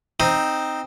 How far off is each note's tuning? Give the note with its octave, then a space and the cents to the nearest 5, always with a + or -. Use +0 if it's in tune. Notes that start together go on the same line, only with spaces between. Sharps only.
C4 +0 D#4 +0